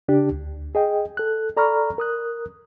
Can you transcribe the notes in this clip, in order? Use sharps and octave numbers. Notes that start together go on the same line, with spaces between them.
C#3 D4 G4
D2
G#4 D#5 G5
A4 F#6
A4 D5 A#5 B5 C#6 F6
A#4 D#6 F#6